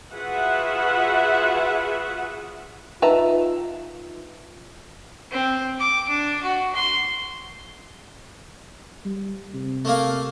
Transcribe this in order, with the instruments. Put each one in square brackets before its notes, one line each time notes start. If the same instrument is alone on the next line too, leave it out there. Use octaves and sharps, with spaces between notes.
[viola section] F4 F#4 G#4 B4 E5 F#5
[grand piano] D#4 E5 [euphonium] F4 [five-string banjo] B4 A5 A#5
[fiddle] C4
D6
D4
F#4
C6
[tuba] G3
C3
[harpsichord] A3 A#3 F5